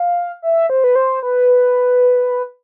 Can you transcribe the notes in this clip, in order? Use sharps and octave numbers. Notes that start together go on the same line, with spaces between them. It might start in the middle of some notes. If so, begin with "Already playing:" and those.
Already playing: F5
E5
C5
B4
C5
B4